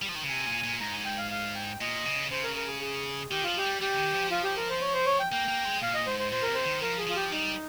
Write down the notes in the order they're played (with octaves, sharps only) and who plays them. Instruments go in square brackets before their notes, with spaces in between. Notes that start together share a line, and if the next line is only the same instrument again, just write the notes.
[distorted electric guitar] G3
F3
D#3
C#3
[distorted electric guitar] C3 [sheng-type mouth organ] G#5
[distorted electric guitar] A#2
A#2
[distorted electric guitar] G#2 [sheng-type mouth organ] A#5
[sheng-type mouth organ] G#5
G5
F5
F5
G5
[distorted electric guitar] A#2 [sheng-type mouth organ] D#5
[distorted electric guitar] C#3
[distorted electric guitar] C#3 [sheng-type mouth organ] C5
[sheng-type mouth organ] A#4
A#4
G#4
G#4
[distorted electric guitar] D#3 [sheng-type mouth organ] G4
[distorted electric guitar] F3 [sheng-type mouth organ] F4
[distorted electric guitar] G#3 [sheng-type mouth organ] G4
[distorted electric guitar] G3
[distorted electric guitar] G3 [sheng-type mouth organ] G4
[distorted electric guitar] C#3
D#3
F3
[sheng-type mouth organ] F4
G4
A#4
C5
C#5
C5
C#5
G5
[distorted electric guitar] A#3 [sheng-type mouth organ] G5
[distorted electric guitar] A#3
G#3
[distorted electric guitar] A#2 [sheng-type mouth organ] F5
[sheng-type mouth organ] D#5
[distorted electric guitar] G#2 [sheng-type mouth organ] C5
[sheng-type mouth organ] C5
[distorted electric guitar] A#2 [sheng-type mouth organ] C5
[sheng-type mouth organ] A#4
[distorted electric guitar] C3
[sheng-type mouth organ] C5
[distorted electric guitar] D#3
[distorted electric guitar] F3 [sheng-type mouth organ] A#4
[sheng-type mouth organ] G#4
[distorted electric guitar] F3 [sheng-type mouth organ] F4
[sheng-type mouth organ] G4
[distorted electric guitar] G3 [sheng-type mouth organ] D#4